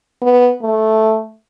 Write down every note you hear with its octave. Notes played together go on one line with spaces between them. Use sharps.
B3
A3